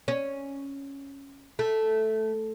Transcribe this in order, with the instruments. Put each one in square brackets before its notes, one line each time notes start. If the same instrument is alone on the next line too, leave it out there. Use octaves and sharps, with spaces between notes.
[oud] C#4
A3